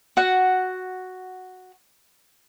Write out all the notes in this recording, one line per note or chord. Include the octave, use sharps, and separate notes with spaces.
F#4 F#5